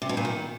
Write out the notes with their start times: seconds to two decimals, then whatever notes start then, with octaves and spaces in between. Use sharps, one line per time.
0.02 C3
0.09 B2
0.17 A#2
0.25 D#3